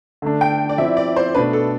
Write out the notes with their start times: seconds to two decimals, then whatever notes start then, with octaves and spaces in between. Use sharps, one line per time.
0.22 D3 A3 D4
0.41 G5
0.69 D5
0.78 F3 E5
0.81 C4 E4
0.97 D5
1.16 C5
1.35 B2 A3 D4 B4
1.53 A4